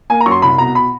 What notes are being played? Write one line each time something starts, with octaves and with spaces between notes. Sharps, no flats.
A#3 G#5
A#5
F#2 C#6
C6
C2 B5
B2 A#5
B5